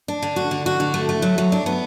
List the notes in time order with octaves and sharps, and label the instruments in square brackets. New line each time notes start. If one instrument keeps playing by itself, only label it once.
[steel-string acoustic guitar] D4
D3
F#4
D3
F#4
D3
A3
A3
F#3
F#3
D4
B3